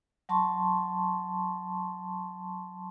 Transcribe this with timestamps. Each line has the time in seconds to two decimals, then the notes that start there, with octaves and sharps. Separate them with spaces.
0.29 F#3 A5 C6 C#6